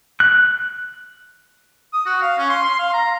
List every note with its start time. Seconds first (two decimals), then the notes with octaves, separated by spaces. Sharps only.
0.20 F#6
1.93 D#6
2.06 F#4
2.21 F5
2.38 C#4
2.49 C6
2.65 C6
2.79 F5
2.94 A#5